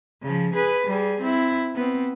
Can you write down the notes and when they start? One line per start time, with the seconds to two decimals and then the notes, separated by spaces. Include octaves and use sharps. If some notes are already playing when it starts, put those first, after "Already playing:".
0.22 C#3 F3
0.54 G#4 B4
0.87 G3 G#4
1.21 C4 E4
1.75 B3 C4